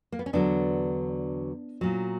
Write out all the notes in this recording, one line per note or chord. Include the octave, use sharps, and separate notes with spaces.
A#3
B3
C#4
E2 D3 F#3 B3 D4
A#2 F#3